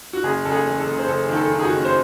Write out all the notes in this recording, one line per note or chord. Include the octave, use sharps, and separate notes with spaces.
F#4
F#1 G#4
F#1 A4
G#4
E2
A4
F#1
C5
F#1 A4
D#3
A4
D#3
G#4
F#4
F#1
C5